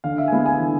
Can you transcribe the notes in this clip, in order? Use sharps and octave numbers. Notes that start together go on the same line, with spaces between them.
D3 F5
E5
G#5
G#3 B3 E4 F5
G#5
D3